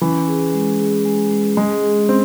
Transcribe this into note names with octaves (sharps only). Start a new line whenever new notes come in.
E3 C#4
G#4
G#3
G#4
G#3
G#3
G#3 G#4
G#4
C4 C#4